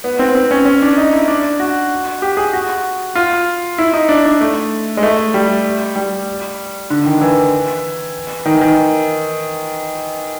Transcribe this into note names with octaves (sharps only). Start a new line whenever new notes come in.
B3
C4
C4
C#4
C#4
D4
D#4
E4
D4
F#4
G4
G#4
F#4
F4
E4
D#4
D4
D4
A3
G#3
A3
G3
G3
D3
D#3
E3
D#3
E3
D#3